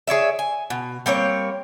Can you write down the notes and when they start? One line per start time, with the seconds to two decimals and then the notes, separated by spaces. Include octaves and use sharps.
0.07 G#4 C#5 D5 E5
0.39 G#5
0.70 B2
1.06 G3 A#3 C4 C#5